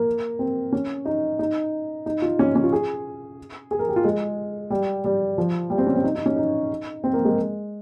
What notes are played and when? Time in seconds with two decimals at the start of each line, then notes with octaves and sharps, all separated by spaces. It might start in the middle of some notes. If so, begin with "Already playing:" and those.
Already playing: A#3
0.39 C4
0.72 C#4
1.05 D#4
1.39 D#4
2.06 D#4
2.22 F4
2.39 C#4
2.55 C#4
2.63 F4
2.72 G#4
3.71 G#4
3.79 A#4
3.88 G4
3.96 F4
4.04 G#3
4.70 G3
5.04 G3
5.38 F3
5.70 G3
5.78 C4
5.87 C#4
5.96 C4
6.04 D#4
6.15 D#4
6.26 C#4
6.36 D#4
7.04 C4
7.13 A#3
7.25 G#3